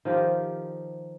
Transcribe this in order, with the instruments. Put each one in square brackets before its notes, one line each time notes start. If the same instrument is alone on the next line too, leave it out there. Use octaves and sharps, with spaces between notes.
[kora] D#3 F3 F4 G4